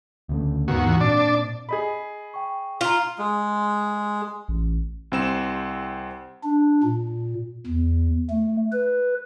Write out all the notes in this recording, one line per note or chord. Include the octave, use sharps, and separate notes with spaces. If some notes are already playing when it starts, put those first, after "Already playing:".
D2 C#3 A3
D#2 G#2 B3 F#4
G#2 E3 G#3
A#2 C4 D4 D5
G#4 D#5 B5
G5 C#6
F4 F5 A#5
G#3
A1
C2 C4 E7
D4
A#2
E2
A3
B4